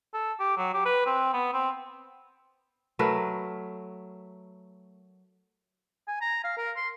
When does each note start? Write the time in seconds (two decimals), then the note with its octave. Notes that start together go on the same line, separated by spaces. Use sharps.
0.14 A4
0.40 G4
0.57 F#3
0.74 G4
0.85 B4
1.06 C4
1.33 B3
1.53 C4
2.99 F#3 A3 A#4 B4
6.08 G#5
6.21 A#5
6.44 F5
6.57 A#4
6.76 C6